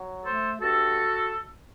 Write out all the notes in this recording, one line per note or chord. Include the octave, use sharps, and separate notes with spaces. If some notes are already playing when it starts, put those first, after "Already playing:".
Already playing: F#3
A3 A4 C5
G2 F#4 A4